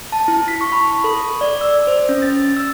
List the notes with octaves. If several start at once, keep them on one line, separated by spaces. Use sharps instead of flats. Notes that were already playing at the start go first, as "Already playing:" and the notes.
A5
E4
B6
C#6
B5
A4
D5
E6
C5
C#4
A6
E6